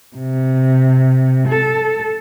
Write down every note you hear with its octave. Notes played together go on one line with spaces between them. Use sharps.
C3
A4